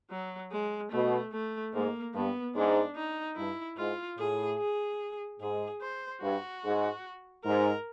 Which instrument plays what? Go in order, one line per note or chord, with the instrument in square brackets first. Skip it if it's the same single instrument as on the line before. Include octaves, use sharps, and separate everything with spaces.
[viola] F#3
G#3
[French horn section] B2 [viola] A3
[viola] A3
[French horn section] G#2 [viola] A#3
[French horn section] G2 [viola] B3
[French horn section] G#2 [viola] D4
[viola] D#4
[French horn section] G2 [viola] E4
[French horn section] G#2 [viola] F4
[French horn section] A2 [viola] G#4
[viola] G#4
[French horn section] G#2 [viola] G#4
[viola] C5
[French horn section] G2 [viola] F#4
[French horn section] G#2
[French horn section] G#2 [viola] A#4